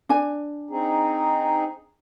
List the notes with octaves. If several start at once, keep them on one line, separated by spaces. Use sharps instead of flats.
D4 G#5
C4 D#4 G#4